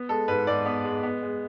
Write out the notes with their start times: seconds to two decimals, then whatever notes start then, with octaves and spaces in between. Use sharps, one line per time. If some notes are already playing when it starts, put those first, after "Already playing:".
Already playing: B3
0.09 G#3 A4
0.28 G#2 B4
0.47 G#2 D5
0.66 B3
0.84 G#3
1.03 B3
1.23 G#3